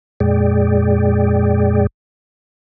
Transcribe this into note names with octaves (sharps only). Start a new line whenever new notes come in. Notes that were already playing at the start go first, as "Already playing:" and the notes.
F2 A#2 G#3 G#4 D5 G5